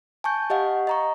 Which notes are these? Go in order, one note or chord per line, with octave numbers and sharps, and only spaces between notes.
G#5 A5 C#6 G6
G4 D#5 F5 F#5
D#5 A#5 C#6